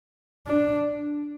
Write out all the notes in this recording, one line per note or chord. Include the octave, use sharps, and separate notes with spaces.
D4